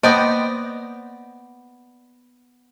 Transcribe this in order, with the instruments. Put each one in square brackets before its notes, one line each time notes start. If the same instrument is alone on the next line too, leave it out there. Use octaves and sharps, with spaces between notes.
[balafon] A#3 [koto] B3 D5 [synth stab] C5 G5 A#6 [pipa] D#5